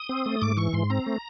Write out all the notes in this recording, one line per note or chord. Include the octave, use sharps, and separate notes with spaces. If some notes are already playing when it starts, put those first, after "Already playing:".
Already playing: D#6
C4
A3
G#2 D6
E3 C#6
G#2 C6
C4 A#5
A3